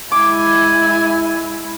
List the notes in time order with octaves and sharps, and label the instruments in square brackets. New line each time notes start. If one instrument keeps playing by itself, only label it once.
[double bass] G#3 E4 [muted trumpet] G#5 [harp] D6